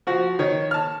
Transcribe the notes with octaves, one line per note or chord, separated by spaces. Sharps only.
F3 F#4
D#3 C#5
A5 F6